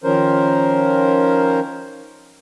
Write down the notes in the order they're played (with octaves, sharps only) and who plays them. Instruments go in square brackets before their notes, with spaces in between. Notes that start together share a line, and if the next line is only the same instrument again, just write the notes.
[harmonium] D#3 F3 C#4 A#4 C5